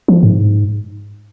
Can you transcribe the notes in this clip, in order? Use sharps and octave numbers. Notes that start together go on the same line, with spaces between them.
F3
G#2